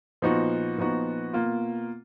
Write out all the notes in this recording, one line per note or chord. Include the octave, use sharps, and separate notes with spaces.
A#2 F3 B3 D#4 F#4
A#2 F3 B3 D#4 F#4
B2 A#3 F4